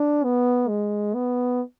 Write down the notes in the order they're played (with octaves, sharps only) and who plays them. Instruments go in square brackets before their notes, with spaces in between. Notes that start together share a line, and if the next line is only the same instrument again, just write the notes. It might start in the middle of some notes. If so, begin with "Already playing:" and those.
Already playing: [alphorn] D4
B3
G#3
B3